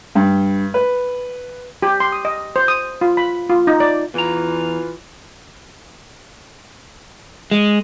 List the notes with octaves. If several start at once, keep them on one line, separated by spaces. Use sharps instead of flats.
G2
B4
G4
C6
D#6
D#5
C5
D#6
F4
B5
F4
D#4
D5
E2 E3 F4 A#5
G#3